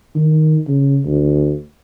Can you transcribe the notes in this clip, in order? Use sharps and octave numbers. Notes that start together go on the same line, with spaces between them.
D#3
C#3
D2